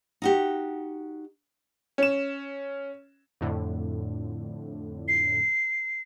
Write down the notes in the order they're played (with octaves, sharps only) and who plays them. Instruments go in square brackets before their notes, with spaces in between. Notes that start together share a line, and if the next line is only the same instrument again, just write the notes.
[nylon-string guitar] D#4 F#4 G4
[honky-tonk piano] C#4 E7
[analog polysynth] F2 A2 D3
[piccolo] C7